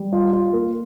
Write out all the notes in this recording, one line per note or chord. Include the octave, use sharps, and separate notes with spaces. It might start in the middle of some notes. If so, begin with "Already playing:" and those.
Already playing: G3
F4
F4
A#3